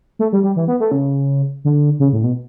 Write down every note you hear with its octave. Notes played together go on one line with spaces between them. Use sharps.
A3
G3
G3
E3
B3
A3
C#3
D3
C#3
A2
B2